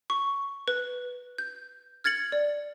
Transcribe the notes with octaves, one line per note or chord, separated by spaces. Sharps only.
C#6
B4
G6
F6 G#6 A6 C#7 F#7
D5